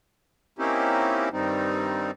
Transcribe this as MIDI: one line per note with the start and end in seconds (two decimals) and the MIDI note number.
0.59 1.29 58
0.59 1.29 60
0.59 1.29 61
0.59 1.29 63
0.59 1.29 64
0.59 1.29 67
1.32 2.11 43
1.32 2.11 51
1.32 2.11 55
1.32 2.11 60
1.32 2.11 63